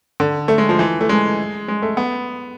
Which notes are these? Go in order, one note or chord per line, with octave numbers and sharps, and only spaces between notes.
D3
A3
G#3
F3
E3
A3
G#3
G#3
A3
B3